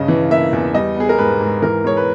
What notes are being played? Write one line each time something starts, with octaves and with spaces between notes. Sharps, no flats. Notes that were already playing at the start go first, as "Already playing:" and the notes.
Already playing: G2 C#3 D#5
E3
A#3 E5
E2
G3 D#5
B3 G#4
A#4
G#2 B4
G#2
E3 A#4
G#3 C#5
B4